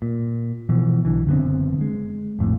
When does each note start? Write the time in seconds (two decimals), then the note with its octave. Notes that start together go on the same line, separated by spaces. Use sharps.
0.02 A#2
0.69 B2 E3 F3
1.05 B1 D3 E3
1.27 F#1 D3 B3 C4
1.81 G#3
2.39 A#1 F2 A2